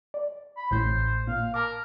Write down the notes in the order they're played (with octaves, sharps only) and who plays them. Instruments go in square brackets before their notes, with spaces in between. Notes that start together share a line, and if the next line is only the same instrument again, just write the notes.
[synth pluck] D5
[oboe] B5
[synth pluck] A1 A2 G6 [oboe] C5
[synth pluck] A#2 [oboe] F5
[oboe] A#4 [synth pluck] A5 D6